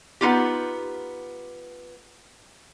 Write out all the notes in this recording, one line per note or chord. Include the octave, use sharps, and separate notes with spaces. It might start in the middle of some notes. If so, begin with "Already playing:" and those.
B3 D#4 F4 G4